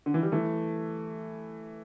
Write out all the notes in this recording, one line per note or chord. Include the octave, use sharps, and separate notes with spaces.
D3
E3
G3
E3 A3